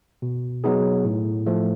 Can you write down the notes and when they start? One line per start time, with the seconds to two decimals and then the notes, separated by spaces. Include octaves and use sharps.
0.22 B2
0.64 F#3 B3 D#4 G#4
1.05 A2
1.46 F3 A3